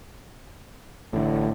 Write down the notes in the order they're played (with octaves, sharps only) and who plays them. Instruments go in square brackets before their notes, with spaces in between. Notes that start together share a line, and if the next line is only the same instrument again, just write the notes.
[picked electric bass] A1 D3 [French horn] A2